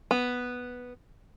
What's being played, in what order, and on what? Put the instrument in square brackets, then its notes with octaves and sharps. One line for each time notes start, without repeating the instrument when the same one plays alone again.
[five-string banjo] B3